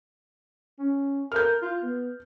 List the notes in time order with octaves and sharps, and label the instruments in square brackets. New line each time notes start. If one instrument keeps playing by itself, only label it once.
[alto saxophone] C#4
[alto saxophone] A#4 [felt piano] F6 G6
[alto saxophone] F4
B3